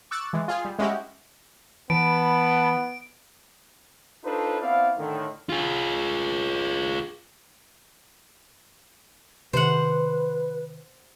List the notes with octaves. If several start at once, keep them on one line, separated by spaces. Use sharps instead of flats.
C#6 D6 E6 F#6 A6
E3 G#3
F4 G#4
G3
G#3 C#4 E4 F#4 G4
E3 B3 A5 B5 D7
D4 D#4 F4 A4 B4 C5
B3 C4 E4 C5 D5 F5
A2 D3 D#3
F4 G#4
C3 D#3 B4 C5 F#5